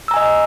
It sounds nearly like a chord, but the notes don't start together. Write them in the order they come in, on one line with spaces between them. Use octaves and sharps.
E6 A#5 G#5 D#5